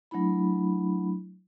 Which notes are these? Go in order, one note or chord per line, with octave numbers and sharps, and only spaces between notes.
F#3 A3 D4 E4 B5